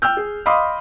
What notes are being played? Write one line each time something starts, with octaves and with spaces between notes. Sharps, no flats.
G5 E6 F6 G6
G#4
D#5 F5 B5 C6 D6 D#6